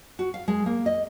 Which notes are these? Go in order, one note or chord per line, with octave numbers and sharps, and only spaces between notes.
F#4
F5
G#3
A#3
D#5